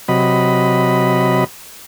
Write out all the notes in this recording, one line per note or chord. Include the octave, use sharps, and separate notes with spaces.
C3 F#3 D#5 B5